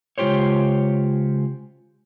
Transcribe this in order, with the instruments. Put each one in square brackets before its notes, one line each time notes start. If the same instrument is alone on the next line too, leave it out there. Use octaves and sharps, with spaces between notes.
[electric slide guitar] C#3 G#3 F4 G4 C5 C#5